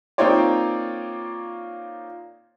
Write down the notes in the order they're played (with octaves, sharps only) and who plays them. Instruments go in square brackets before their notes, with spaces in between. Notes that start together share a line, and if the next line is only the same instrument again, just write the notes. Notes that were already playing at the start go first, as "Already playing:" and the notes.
[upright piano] A#3 C4 D#4 F4 C#5 D5